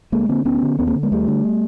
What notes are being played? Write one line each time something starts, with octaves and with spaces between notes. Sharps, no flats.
D2 G#3 A#3
D3 A#3 C4
D2 B3 C#4
D3
D#2 B3 C#4
A#3 C4
D3
G#3 A#3
D#2 G3 A3
D3